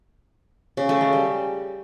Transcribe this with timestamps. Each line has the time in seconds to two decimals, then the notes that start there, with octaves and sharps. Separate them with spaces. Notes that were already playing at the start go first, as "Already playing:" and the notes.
0.77 C#3
0.89 A3
1.01 G#3
1.13 G3